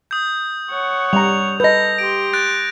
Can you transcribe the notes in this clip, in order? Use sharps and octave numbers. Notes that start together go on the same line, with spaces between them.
D#6 G6
C#5 F#5
G3 A#5 F7
A4 B4 D#5 G6 A#6
G4 C6 D7
F#6 A6 D7